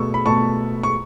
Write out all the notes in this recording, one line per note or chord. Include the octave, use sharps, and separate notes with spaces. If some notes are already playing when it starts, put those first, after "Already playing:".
Already playing: B2 A3 C#6 E6
B5
B2 A3 A5 C#6
C#6